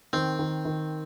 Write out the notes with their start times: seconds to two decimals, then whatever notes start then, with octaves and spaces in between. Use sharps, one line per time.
0.13 D#3 C4
0.39 D#3
0.65 D#3